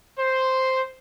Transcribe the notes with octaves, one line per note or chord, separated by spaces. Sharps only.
C5